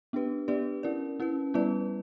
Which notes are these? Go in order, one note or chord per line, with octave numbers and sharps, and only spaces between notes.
B3 D4 G4 B4
B3 D4 G4 B4 D5
C#4 E4 A#4 D5
C#4 E4 B4
G3 B3 E4 B4 D5